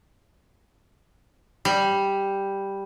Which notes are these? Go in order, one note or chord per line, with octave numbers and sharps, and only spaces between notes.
G3